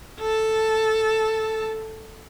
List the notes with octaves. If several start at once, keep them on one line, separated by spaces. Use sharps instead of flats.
A4 A5